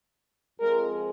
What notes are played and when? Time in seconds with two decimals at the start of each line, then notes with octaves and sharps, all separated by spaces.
0.60 F2 F3 G#3 A#4